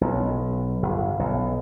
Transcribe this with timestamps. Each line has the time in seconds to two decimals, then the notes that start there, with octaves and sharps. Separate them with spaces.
0.01 B1
0.83 G1
1.19 B1